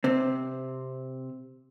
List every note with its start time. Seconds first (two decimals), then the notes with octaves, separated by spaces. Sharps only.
0.04 C3 C4